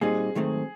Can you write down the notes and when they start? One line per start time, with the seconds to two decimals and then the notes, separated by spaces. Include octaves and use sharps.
0.01 A#2 G3 C4 D#4 G#4
0.35 G#2 D#3 F#3 A3 C4